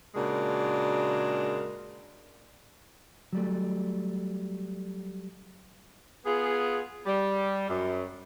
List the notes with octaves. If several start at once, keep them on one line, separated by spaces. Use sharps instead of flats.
A#2 C#3 G#3 D4 F#4 A#4
F#3 G3 A3
B3 F4 G#4
G3
F#2